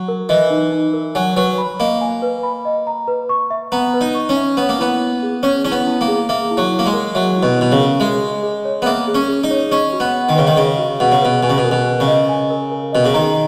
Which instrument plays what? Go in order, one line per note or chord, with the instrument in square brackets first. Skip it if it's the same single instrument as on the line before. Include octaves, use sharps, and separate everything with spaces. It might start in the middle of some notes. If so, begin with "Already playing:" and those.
Already playing: [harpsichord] F#3
[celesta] A#4
[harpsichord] E3 [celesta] D#5
[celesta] D#4
D#4
A#4
[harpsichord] F#3 [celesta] G#5
[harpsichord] F#3 [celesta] B4
[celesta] B5
[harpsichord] A#3 [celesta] D#5
[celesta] G#5
B4
B5
D#5
A#5
B4
C#6
E5
[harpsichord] B3 [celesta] A#5
[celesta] B4
[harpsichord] D#4
[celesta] C#6
[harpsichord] C#4
[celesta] E5
[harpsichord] B3 [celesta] C#5
[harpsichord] A#3
[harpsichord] B3 [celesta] E4
[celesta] E4
G#4
[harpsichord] C#4 [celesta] C#5
[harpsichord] C#4 [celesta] E4
[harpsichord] B3
[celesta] E4
[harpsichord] A#3
[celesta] G#4
[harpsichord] A#3 [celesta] E5
[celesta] E4
[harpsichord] F#3
[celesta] E4
[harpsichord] A#3
G#3
[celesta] A#4
[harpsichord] F#3 [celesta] E5
[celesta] E4
[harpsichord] B2
[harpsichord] B2 [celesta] E4
[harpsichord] C#3
[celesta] A#4
[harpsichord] G#3 [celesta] E5
[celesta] G#4
G#4
C#5
[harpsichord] B3
[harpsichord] A#3 [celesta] E5
[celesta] G#4
[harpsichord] C#4
[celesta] G#4
[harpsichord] D#4
[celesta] C#5
[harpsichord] C#4 [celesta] D#5
[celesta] F#4
[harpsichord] B3
[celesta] F#5
[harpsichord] D#3
[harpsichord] C#3 [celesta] B4
[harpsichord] D#3
[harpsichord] C#3 [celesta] D#5
[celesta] F#4
[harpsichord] B2 [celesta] F#5
[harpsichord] C#3
[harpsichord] B2 [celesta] B4
[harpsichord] B2 [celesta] G#5
[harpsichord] C#3
B2
[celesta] A#4
[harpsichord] B2
[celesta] A#4
[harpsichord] C#3
[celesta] D#5
G#5
A#4
A#4
[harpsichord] B2 [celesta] D#5
[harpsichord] C#3
[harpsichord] D#3 [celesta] A#5